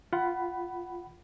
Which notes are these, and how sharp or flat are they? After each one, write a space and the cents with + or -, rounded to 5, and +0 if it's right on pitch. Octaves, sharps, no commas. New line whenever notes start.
F4 +0 F#5 +25 B5 +0